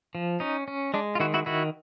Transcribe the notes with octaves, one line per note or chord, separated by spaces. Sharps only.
F3
C#4 D#4
C#4
G#3 D4
F4
D#3 E4 F#4
E4 F#4
D#3 E4 F#4